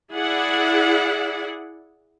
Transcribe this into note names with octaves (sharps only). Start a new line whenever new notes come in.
E4 G#4 D5 F#5